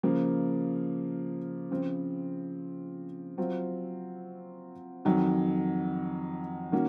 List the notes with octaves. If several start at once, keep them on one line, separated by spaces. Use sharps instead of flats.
C#3 F3 A#3
C#3 F3 C4
F#3 C4 F4
F2 D#3 F#3
D#3 A#3 C#4 F#4